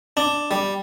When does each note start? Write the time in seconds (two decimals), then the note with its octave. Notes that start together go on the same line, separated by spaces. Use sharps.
0.17 D4
0.51 G3